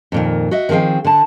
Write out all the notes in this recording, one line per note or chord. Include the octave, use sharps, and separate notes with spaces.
F2 A#2 D#3
F#4 D#5 E5
D#3 F3 C4 G#4 G5
D3 A5